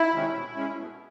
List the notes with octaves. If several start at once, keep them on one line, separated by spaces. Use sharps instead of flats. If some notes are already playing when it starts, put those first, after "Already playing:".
Already playing: E4
C3 D#3 G#3 C#4
B2
G#3 C#4
B2